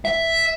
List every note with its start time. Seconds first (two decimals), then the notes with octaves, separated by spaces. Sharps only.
0.05 E5